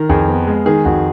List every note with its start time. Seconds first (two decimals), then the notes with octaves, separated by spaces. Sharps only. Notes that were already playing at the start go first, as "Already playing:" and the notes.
Already playing: D#3 A#4
0.09 F2 G#4
0.28 B3
0.47 G#3
0.66 D#3 G#4
0.85 F2 F#4